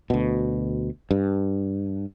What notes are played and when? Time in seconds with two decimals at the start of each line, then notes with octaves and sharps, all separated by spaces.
0.10 D2 B2
1.11 G2